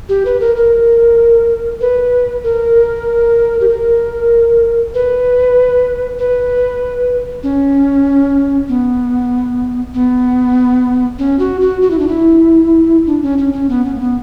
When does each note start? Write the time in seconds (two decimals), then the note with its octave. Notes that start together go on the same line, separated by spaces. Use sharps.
0.09 G4
0.25 B4
0.41 A#4
0.56 A#4
1.81 B4
2.44 A#4
3.61 G4
3.68 A#4
4.94 B4
6.19 B4
7.43 C#4
8.69 B3
9.94 B3
11.19 C#4
11.39 F#4
11.61 F#4
11.81 F#4
11.91 E4
11.99 D4
12.08 E4
13.06 D4
13.23 C#4
13.38 C#4
13.53 C#4
13.69 B3
13.85 C#4
13.95 A#3
14.00 B3